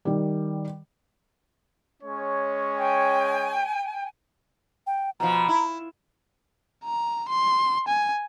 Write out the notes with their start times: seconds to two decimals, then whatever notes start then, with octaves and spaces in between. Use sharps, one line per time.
0.05 D#3 G3
2.02 G#3 C#4 C#5
2.78 G5 G#5
4.87 G5
5.20 B2 F3 A#5
5.48 E4
6.85 A#5
7.29 C6
7.88 G#5